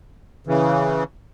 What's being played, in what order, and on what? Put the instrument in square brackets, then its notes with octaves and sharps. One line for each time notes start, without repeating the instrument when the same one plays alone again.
[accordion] C#3 E3